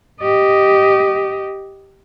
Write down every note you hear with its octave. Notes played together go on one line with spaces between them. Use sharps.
G4 D#5